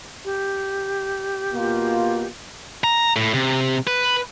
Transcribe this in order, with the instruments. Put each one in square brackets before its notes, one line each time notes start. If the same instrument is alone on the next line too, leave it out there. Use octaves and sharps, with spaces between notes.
[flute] G4
[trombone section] B2 A#3 F4
[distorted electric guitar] A#5
A2
C3
B4